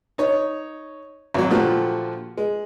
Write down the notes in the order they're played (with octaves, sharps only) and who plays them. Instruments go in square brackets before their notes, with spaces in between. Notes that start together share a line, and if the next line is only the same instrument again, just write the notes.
[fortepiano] D#4 C#5
G#1 F#3
A#2 D3 F3 A3 F#4 G4
G#3